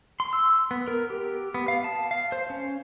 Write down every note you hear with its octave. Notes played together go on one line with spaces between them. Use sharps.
C6
E6
B3
A#4
G4
B3
F5
A5
F5
C5
C#4